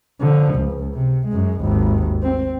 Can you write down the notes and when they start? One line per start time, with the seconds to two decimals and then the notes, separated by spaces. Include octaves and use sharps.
0.21 D3 F3
0.54 C#2
0.94 C3
1.28 F#2 G#3
1.61 G#1 D#2
2.23 C4